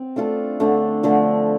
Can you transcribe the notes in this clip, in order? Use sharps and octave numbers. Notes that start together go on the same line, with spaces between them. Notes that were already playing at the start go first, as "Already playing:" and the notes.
Already playing: C4
A3 D4 F4 A4
D3 A3 D4 A4
D3 F3 A3